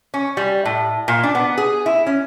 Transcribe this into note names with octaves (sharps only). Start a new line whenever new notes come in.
C#4
G3
A2
A#2
D4
B3
G#4
E4
C#4